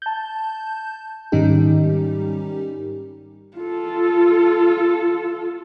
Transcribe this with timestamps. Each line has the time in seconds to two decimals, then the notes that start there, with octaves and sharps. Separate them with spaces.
0.02 A5 G6
1.32 G#2 D#3 G3 C#4 D#4 G4
3.57 F4 A4